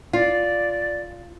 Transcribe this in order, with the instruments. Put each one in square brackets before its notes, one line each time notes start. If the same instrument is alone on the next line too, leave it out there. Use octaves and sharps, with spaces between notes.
[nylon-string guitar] F4 [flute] D5